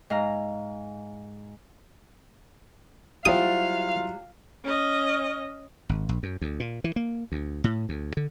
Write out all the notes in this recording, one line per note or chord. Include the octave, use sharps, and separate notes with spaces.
G#2 F5 A#5
F#3 G3 E4 F4 G4 C5 F5 D#6
C#4 D#5
G#1
A#1
F#2
D2
A#2
E3
A#3
D2
A2
D2
D3